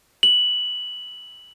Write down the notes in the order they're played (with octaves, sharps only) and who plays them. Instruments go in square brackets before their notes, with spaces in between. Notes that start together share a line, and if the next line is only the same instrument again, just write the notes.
[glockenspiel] F#7